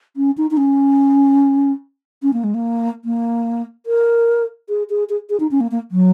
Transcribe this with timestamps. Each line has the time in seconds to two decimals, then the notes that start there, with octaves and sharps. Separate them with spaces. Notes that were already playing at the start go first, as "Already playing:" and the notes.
0.16 C#4
0.37 D#4
0.51 D#4
0.57 C#4
2.22 C#4
2.33 A#3
2.44 G#3
2.54 A#3
3.05 A#3
3.86 A#4
4.69 G#4
4.90 G#4
5.09 G#4
5.30 G#4
5.40 D#4
5.51 C#4
5.61 A#3
5.71 A#3
5.91 F#3